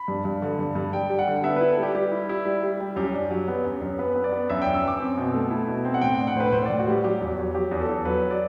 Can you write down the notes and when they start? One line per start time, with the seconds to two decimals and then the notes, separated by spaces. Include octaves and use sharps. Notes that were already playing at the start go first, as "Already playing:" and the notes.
Already playing: B5
0.08 G2
0.25 G2
0.42 D3
0.59 G2
0.75 G2
0.93 G3 G5
1.10 G3
1.19 F#5
1.28 D3
1.44 B3 E5
1.56 E4 B4
1.69 A4
1.78 G3 G4
1.94 G3 G4
2.12 E4
2.29 E4
2.45 G3
2.63 G3
2.80 G3
2.96 F#2 G4
3.14 D4
3.31 F#3
3.48 B3
3.65 F#2
3.81 F#2
3.99 B3 B4
4.15 B3
4.24 D5
4.32 B3
4.50 F#2 E5
4.62 G5
4.67 F#2
4.74 E6
4.83 F#2 D6
5.00 C4
5.17 B2
5.34 A3
5.51 E4
5.68 B2
5.85 C4
5.94 F#5
6.01 A2 G5
6.15 D4 G5
6.27 F#5
6.35 A2 C5
6.40 B4
6.52 A2 C5
6.65 A2 D5
6.79 F#4
6.87 G3 G4
7.04 F#3 G4
7.21 E2
7.38 F#3
7.54 F#3 G4
7.71 E2
7.80 A4
7.89 E2
8.05 F#3 B4
8.31 D5